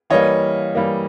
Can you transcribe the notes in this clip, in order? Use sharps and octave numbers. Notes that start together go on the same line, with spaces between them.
E3 G3 A#3 C#5 D#5
E3 G3 A#3